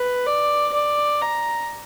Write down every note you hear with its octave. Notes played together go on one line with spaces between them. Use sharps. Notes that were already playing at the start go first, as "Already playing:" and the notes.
Already playing: B4
D5
D5
A#5